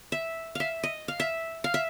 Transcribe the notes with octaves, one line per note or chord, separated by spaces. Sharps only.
E5
E5 F5
D#5
F5
E5
F5
E5